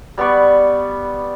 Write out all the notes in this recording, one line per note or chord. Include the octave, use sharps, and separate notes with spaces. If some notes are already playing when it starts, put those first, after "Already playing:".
G3 B3 D5 C#6